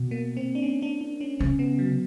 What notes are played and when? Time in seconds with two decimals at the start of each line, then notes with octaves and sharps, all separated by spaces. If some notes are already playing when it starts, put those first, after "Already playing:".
Already playing: B2
0.11 A#3
0.37 C4
0.55 D4
0.62 C#4
0.82 D4
1.01 D4
1.21 C#4
1.39 C#3 C4
1.59 B3
1.79 F#3